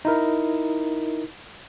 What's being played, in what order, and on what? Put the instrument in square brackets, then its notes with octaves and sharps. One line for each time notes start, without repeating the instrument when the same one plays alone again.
[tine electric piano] D#4 E4 A#4